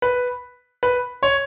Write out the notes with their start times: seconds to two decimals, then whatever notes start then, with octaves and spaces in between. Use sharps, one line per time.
0.02 B4
0.83 B4
1.23 C#5